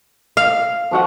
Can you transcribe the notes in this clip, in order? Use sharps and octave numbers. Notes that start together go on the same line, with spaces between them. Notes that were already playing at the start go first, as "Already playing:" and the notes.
F5
F3 F#4 F#5